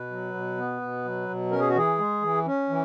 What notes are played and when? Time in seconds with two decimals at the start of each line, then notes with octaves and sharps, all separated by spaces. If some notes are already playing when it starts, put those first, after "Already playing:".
Already playing: B2 B4
0.10 F#3
0.34 B2
0.57 B3
0.81 B2
1.05 F#3
1.29 B2
1.51 C#4 A#4
1.60 G#4
1.69 F#4
1.75 E3 G#4
1.98 G#3
2.22 E3
2.46 C#4
2.69 E3